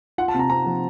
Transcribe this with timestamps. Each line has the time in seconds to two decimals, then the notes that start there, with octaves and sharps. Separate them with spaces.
0.18 F4 F#5
0.28 A5
0.34 C3
0.39 A#5
0.50 C4 A#5
0.66 F3